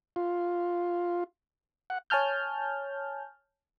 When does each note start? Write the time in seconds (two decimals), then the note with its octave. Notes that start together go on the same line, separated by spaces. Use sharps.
0.16 F4
1.90 F#5
2.10 C#5 G#5 A5 F6 G6